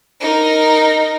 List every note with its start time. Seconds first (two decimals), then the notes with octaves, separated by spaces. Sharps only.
0.20 D#4 A#4